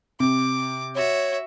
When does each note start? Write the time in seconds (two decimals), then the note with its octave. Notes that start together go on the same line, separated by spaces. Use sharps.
0.20 C3 D6
0.95 F#4 C#5 E5